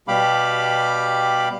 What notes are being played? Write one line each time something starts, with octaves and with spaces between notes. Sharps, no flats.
B2 G3 G4 F5 B5 D6